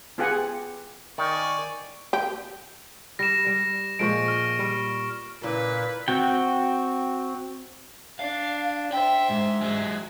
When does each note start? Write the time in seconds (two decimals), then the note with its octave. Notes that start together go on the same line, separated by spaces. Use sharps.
0.18 B3 F4 G4 G#4 F#5 G#5
1.18 D#3 D5 G#5 C#6
2.13 G4
3.19 G3 A#6 E7
3.46 G3
3.99 A#2 F3 G#3 C#6 D7
4.28 F6
4.59 G3
5.43 A#2 C#3 E4 B4 D5
6.08 C4 F#4 G5
8.19 D4 F5
8.92 C5 E5 G5
9.30 G#2
9.61 F#3 G#3